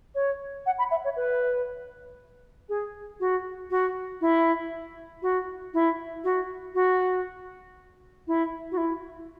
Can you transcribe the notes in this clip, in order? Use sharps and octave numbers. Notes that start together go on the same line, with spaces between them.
C#5
F#5
B5
E5
C#5
B4
G#4
F#4
F#4
E4
F#4
E4
F#4
F#4
E4
F#4
E4